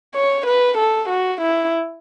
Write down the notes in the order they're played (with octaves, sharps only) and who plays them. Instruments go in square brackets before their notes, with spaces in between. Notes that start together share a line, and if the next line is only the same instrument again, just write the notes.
[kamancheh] C#5
B4
A4
F#4
E4